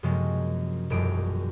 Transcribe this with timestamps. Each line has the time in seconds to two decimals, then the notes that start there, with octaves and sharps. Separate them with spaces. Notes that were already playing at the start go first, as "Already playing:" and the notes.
0.03 F#2 C3 F3 G#3 A#3 C#4
0.90 E1 A#1 F#2 G3 D#6 D7